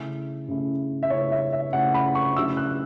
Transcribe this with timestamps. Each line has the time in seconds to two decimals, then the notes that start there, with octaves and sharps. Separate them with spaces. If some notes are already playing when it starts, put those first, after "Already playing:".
Already playing: C#3 A3 C#4 E4
0.49 C#3 A3 C#4 E4
1.03 E5
1.10 C#3 A3 C#4 E4 C#5
1.32 E5
1.53 E5
1.73 C#3 A3 C#4 E4 F#5
1.94 B5
2.15 C#6
2.36 C#3 F#3 A3 E4 E6
2.57 F#6